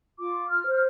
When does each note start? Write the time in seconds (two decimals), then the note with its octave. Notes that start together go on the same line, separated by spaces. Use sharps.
0.20 F4 D6
0.50 F6
0.66 C5
0.73 F6